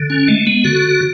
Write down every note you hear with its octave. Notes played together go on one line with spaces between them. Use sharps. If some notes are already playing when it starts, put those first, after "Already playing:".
Already playing: D3
C#4
G#3 A3
B3
D3 F#4